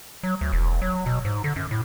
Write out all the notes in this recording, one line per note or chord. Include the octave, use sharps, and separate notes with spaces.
F#3
D2
E1
F#3
B2
G#2
D3
F#2
A2